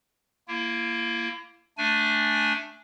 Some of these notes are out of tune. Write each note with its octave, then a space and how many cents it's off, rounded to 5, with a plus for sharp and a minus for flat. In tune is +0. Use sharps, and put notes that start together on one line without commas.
A#3 +0 E4 +35
A3 +0 D4 +0 G#5 +0